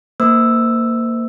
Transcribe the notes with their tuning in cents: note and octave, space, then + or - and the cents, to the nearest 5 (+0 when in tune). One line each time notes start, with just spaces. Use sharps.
A#3 -15 C5 -30 E6 +0